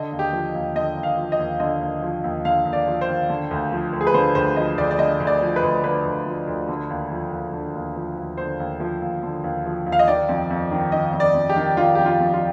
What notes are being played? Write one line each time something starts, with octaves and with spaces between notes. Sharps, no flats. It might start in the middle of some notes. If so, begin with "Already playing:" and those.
Already playing: D3 D#5
D#2
G4
F3
D#2
D3 D#5
D#2
F5
F3
D#5
D#2
D3 D#5
D#2
F3
D#2
D3 F5
D#2
D5
F3
C5
D#2
D3
D2
F3
D2
G#4
B4
D3 C5
D2 C5
F3 D#5
D2 D5
D5
D3 D#5
D2
D5
F3
B4
D2
D3 B4
D2
F3
D2
D3
D#2
F3
D#2
D3
D#2
F3
D#2
D3 C5
D#2
F3
D#2
D3
D#2
F3
D#2
F5
D#5
D#3 D5
F2
F2
D#3
D#3 D#5
F2
D5
F2
G4
D#3
D#3 F4
F2 G4
F4
F2
F4